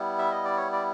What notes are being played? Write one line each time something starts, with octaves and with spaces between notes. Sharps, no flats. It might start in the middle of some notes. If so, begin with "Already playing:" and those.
Already playing: G3 B3 E4
E5
D#5
D5
C#5
D5